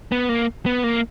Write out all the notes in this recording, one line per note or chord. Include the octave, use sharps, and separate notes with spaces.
B3
A#3
B3
A#3